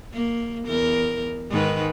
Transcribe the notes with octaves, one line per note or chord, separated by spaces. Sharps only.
A#3
E2 A#4
G#2 D#3 B4